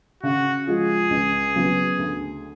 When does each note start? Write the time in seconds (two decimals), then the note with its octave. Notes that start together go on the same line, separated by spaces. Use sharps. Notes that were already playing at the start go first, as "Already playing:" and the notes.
0.23 C#3 F#4
0.67 F3 G#3 G#4
1.10 C#2
1.55 C#3 F#3 B3
1.99 D2